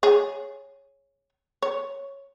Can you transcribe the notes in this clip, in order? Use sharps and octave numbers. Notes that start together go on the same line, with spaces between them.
G#4 C#5
C#5